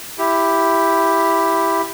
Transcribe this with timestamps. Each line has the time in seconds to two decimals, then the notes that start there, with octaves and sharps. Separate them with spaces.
0.19 E4 G4